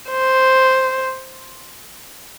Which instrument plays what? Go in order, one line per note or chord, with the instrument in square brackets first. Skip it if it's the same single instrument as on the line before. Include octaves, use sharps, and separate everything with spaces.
[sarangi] C5